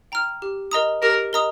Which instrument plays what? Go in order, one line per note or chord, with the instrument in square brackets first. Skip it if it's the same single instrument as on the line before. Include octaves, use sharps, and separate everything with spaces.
[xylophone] G5 A#5 F6
G4
A#4 D#5 A#5 D#6
[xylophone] G4 [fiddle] A#4
[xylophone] A#4 D#5 A#5 D#6